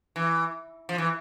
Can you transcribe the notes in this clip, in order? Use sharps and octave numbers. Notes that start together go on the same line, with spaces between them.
E3
F3
E3